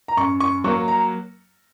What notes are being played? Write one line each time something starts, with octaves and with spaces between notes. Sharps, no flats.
A#5
F#2 C#6
C#6
F#3 A#3 C#6
A#5